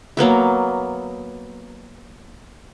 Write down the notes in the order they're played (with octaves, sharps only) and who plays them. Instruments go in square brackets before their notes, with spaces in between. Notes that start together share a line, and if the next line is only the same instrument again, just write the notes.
[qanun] F#3 A#3 B3 E5